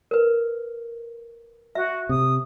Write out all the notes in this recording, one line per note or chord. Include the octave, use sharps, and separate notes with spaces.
A#4 B4
F#4 E5
C3 D#6